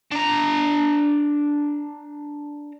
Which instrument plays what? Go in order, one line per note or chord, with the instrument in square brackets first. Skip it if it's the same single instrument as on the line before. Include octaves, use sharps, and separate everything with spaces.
[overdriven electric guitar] D4 A#5